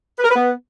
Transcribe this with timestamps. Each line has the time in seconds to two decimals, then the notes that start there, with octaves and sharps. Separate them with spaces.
0.18 B4
0.24 A#4
0.30 B4
0.36 B3